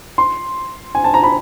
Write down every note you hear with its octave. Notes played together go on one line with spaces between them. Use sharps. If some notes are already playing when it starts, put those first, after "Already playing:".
C6
G#5
A5
A#5
B5